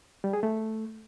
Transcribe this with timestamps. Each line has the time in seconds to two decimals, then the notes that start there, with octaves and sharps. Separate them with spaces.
0.24 G3
0.33 G#4
0.43 A3